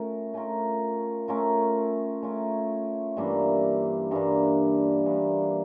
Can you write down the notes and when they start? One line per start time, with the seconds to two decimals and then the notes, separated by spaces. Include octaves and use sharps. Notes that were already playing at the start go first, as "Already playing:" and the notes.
Already playing: A3 C#4 F4 A#4
0.34 A3 C#4 F4 A#4
1.28 A3 C#4 F4 A#4
2.22 A3 C#4 F4 A#4
3.17 G2 E3 A#3 D4
4.11 G2 E3 A#3 D4
5.06 G2 E3 A#3 D4